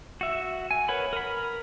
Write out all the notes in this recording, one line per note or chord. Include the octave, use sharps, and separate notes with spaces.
F#4 E5
G#5
A#4 B4 C#5 F#5 B5
A#4 B5